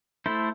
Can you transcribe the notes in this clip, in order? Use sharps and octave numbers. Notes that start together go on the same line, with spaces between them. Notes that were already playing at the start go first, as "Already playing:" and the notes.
A3 E4 A4 C5